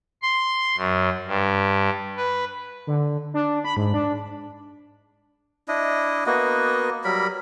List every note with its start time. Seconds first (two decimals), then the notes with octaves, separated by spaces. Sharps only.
0.22 C6
0.77 F#2
1.27 G2
2.17 B4
2.87 D3
3.34 D4
3.64 B5
3.77 G#2
3.94 D4
5.68 D4 E4 D#5
6.26 A#3 B3 F#4 D#5
7.04 F#3 G3 A#4 B5